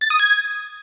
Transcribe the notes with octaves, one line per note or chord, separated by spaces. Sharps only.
A6
D#6
G#6